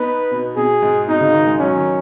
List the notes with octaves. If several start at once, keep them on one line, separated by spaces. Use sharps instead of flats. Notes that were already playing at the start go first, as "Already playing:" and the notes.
Already playing: B3 D#4 B4
B2
B2 G#4
G#2
B2 D#4
C#3
D#3
G#3
F#3 C#4
D#3